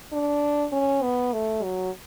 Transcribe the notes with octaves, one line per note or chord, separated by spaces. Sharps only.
D4
C#4
B3
A3
F#3